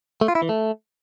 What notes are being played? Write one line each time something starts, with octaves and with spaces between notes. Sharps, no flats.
A3
F4
E4
E3
A3